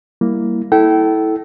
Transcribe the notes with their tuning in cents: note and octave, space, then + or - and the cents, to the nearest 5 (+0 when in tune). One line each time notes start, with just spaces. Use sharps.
G3 +0 A#3 +0 E4 +0
E4 -20 A4 -10 G5 -30